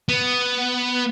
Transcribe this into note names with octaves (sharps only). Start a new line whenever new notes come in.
B3